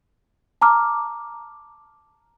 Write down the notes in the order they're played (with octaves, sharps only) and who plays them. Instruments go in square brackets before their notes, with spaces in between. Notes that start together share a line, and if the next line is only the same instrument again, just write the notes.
[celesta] A5 A#5 D6 F6